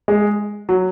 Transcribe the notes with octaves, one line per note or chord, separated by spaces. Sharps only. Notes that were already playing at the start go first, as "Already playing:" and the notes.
G#3
F#3